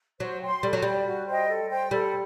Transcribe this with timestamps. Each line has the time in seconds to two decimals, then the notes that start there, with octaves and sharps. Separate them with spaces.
0.20 F#3 C5
0.41 G5 C6
0.63 G3 A4
0.73 F#3
0.82 G3 D5 G5
1.06 F#4
1.27 C5 D#5 G5
1.48 A4
1.70 C5 G5
1.91 G3 A4